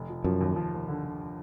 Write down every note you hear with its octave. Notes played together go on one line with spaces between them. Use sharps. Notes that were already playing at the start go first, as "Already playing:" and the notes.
Already playing: F1
F3
F#2 F3
D#2
F3
D#2
D3
D3